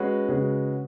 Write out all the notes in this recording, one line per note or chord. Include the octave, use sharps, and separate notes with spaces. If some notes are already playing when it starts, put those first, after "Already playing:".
Already playing: G#3 C#4 F#4 B4
C#3 G#3 C#4 F#4 B4